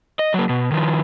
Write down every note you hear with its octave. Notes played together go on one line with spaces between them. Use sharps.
D#5
F#3 A#3
B2
D#3 F3